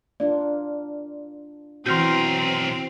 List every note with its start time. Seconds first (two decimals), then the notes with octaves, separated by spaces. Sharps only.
0.20 A#3 D4 F4 D5
1.86 B1 E3 C4 F#4 A#4 C6 F6 G6